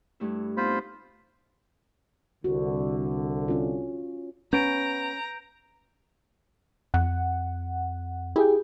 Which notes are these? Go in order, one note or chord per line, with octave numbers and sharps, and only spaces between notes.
G2 A3 E4
B3 C4 D#4 F4 C5 B5
C2 D3 F#4
C#4 F4
B3 C#4 A#5 G6 D7
F2 F#5
E4 G4 G#4 G5